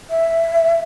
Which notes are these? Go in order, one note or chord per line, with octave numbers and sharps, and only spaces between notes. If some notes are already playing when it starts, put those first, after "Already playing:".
E5